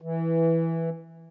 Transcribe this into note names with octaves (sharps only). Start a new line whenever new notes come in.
E3